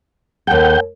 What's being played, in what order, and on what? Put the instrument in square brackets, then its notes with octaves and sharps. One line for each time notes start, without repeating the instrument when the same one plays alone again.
[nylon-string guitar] D#2 A4 [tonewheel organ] F#5 G5 G6